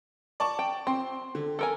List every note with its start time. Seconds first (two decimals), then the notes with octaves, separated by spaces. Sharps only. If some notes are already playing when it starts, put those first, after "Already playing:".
0.40 D5 A5 C#6
0.59 G5
0.87 C4 C6
1.35 D3
1.59 A4 A#4 G#5